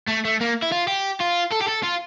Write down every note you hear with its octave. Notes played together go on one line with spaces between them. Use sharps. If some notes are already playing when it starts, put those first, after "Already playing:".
A3
A3
A#3
E4
F4
G4
F4
A4
G4
A4
F4